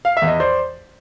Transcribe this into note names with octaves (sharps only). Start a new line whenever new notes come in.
F5
E5
E2
D#5
C5 D5